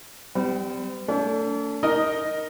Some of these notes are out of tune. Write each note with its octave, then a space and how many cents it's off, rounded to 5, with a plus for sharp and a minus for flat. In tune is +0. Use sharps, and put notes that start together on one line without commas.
G3 +0 C4 -45
A3 +30 D4 -45
D#4 +0 A#4 +0 D#5 -5